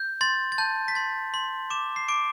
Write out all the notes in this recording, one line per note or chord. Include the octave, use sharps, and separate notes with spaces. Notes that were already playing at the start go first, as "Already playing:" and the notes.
Already playing: G6
C6 A6
A6
A5 G6
B6
C6 A6
C6
D6 E7
C7
D6 D7